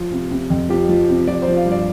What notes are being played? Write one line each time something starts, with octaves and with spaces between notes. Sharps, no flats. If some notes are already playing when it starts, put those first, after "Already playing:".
Already playing: F3 F4
C3
C3
F2
F3 G4
F3
C3
F3 D5
C5
F3
F5
G2
D5